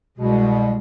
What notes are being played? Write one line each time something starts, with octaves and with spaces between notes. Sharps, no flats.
C2 B2 G3 G#3